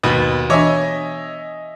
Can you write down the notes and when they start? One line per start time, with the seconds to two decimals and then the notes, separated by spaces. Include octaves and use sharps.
0.03 D#2 B2 B3 B5
0.50 E3 D4 C#5 D#5 E5 G#5